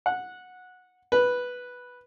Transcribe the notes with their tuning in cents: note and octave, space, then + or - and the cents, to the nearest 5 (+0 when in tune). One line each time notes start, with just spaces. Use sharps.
F#5 -15
B4 -5